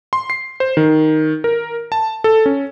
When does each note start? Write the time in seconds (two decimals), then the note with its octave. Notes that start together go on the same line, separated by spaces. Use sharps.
0.13 C6
0.30 C7
0.60 C5
0.77 D#3
1.44 A#4
1.92 A5
2.24 A4
2.46 C#4